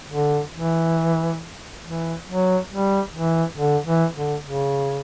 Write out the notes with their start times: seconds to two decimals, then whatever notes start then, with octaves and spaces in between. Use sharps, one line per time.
0.09 D3
0.53 E3
1.84 E3
2.27 F#3
2.70 G3
3.14 E3
3.57 D3
3.85 E3
4.15 D3
4.43 C#3